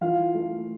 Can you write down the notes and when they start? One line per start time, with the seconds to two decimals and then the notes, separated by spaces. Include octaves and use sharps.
0.01 E3 F4 F5
0.35 A3